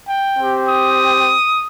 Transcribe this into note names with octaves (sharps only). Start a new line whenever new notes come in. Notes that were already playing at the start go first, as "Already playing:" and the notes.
G5
C4 G4
D#6